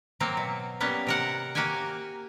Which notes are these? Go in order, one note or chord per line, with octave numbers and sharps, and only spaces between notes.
F#3 A#3 C4
B2
G3 A#3 B3 C#4
C3 A#4 F#5
A#3 F#4 G4 G5 G#5